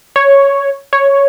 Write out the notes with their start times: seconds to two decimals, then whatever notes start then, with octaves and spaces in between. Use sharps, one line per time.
0.16 C#5
0.93 C#5